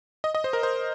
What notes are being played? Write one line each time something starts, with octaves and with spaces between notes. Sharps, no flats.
D#5
D#5
C5
A#4
C5